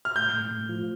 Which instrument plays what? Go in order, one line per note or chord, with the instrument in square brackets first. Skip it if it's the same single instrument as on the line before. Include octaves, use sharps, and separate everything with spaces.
[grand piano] F6
[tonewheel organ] A2 [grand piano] G6
[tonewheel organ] A2
A2
F3